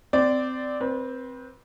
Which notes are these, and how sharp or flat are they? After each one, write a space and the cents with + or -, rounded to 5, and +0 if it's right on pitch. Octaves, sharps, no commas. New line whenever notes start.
C4 -20 D5 +0
C4 +0 B4 -30